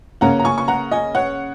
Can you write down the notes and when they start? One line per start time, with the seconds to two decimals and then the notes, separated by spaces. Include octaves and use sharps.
0.21 C#3 A#3 C#4 F#5 A#5
0.39 A#5
0.45 G#5 C#6
0.58 C#6
0.68 F#5 A#5
0.91 D#5 G#5
1.15 C#5 F#5